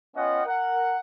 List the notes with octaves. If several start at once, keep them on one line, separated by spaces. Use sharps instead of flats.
B3 C#4 F4 D#5 F#5 G5
A#4 F#5